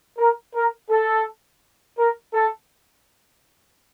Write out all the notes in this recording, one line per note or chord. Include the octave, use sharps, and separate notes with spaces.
A#4
A#4
A4
A#4
A4